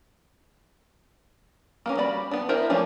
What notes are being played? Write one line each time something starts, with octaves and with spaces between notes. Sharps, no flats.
A#3 B3 C#4
G3 F#4 D5 B5
B3 D4
B3 D4 E4 A#4 C5
F3 A3 A#3 C#4 D4